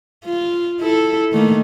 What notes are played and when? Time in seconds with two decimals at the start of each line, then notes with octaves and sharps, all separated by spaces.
0.25 F4
0.80 E4 A4
1.32 D#3 A3 A#3